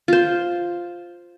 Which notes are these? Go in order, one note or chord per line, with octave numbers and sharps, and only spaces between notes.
F4 C5